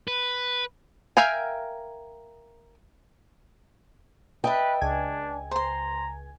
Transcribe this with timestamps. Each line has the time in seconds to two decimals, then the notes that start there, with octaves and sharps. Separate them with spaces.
0.08 B4
1.17 A#4 E5 F5 G5 G#5
4.44 B4 D#5 E5 G5 A5
4.81 C#2 D4 G#5 G#6
5.51 C5 A#5 C6